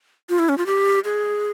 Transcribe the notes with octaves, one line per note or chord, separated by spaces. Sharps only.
F4
E4
C#4
F4
G4
G#4